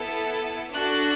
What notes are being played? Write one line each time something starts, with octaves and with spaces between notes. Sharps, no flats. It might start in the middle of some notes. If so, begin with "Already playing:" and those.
Already playing: B3 E4 A4
D4 F#4 A4 F#6